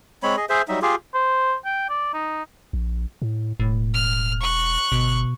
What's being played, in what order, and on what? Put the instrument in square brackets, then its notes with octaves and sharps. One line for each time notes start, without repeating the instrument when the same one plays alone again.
[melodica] G#3 C4 C#5 B5
G#4 D#5
G#4 C5 E5
F#3 G3 D#4 E5
F4 G4 G#4
[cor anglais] C5
G5
D5
D#4
[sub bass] A#1
A2
[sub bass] E1 [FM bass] A2
[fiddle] F6
C#6 F#6
[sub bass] G1 [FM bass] B2